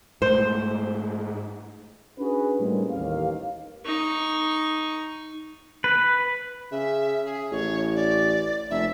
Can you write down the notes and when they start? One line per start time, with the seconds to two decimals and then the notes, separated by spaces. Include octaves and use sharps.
0.22 G#2 A3 C5
2.19 C#4 D4 F#4 G#4 B4
2.59 A2 G3 G#3 A#3 C4 C#4
2.91 A1 D#2 F5
3.85 D#4 C#6
5.84 B4
6.72 C#3 E5
7.25 G#4
7.51 A1 C#5
7.95 D5
8.70 F1 E5